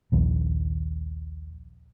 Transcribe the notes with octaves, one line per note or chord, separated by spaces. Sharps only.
A#1 D#2